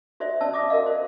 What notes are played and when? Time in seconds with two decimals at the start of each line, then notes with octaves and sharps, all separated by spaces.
0.20 F#4 C5 D5 E5
0.41 C#4 D5 A5 E6
0.54 E5 D6 D#6
0.70 F#4 A#4 D5 D#5 F5
0.86 C5